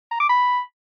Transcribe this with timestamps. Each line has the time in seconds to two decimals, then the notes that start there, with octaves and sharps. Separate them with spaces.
0.11 A#5
0.20 D6
0.29 B5